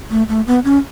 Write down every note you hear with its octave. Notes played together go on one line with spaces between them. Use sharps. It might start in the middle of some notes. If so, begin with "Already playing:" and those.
A3
A3
B3
C#4